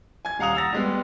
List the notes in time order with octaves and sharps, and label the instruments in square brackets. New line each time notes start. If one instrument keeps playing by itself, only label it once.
[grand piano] G#5 G#6
D#1 F5 F#5 A#5 D#6 F7
E6 A6 A#6
G3 G#3 B3